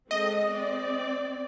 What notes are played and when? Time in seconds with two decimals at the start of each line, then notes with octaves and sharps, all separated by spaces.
0.11 G#3 C4 A4 D#5
0.52 C4 D5